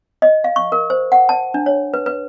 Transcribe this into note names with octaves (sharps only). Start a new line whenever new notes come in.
D#5
F5
C#6
A#4
C5
F#5
A5
D4
C#5
B4
B4